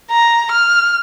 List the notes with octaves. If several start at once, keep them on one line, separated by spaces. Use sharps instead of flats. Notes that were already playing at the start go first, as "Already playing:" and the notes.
A#5
F6